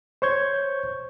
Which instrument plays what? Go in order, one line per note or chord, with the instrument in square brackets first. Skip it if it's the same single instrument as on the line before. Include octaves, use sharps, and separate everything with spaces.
[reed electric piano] C5 C#5 C#6 G6 G#6